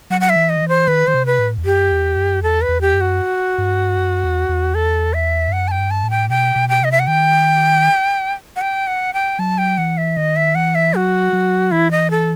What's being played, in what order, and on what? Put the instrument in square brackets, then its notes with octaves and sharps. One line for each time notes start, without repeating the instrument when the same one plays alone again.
[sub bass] F#3 [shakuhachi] F#5
[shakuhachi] F#5
E5
[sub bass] E3
[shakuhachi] D#5
[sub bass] D#3
E3
[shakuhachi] C5
[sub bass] D#3 [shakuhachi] B4
[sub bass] D#3 [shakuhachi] C5
[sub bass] C3
[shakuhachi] B4
[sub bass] A2
E2
[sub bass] F#2 [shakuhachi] G4
[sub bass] E2
F#2
[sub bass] E2 [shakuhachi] A4
[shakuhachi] B4
[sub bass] E2
[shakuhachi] G4
[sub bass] F#2
[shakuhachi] F#4
[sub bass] G2
F#2
E2
E2
[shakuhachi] A4
E5
[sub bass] G2
[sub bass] F#2 [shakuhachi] F#5
[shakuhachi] A5
G5
[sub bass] G2
[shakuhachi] A5
[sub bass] A2
[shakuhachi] G5
[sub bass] B2 [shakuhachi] G5
[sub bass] B2
[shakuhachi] G5
[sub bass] C3 [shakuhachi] D#5
[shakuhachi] E5
F#5
[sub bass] D#3 [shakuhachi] G5
[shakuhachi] F#5
G5
F#5
G5
[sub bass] F#3 [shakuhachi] A5
[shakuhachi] G5
[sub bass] E3 [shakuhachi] F#5
[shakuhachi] E5
[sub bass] D#3 [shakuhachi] D#5
[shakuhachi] E5
[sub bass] E3 [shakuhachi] F#5
[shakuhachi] E5
[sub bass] F#3 [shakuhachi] F#4
[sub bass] F#3
[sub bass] E3 [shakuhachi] E4
[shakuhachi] D#5
A4